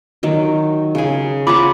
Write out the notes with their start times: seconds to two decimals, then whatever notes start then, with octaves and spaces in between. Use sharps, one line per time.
0.23 D#3 F#3
0.95 C#3 G#4
1.47 F4 F#5 A#5 B5 D6